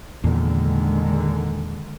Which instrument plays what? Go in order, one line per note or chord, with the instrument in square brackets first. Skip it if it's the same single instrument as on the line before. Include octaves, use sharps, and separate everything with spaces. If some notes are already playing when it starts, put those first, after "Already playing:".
[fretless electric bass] E2 A#2 [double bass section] D3 D#3 G#3